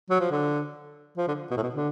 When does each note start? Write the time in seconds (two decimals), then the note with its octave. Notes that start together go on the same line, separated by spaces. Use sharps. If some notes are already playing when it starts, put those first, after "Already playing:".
0.10 F#3
0.20 F3
0.31 D3
1.17 F3
1.28 D3
1.51 B2
1.57 A2
1.63 B2
1.75 D3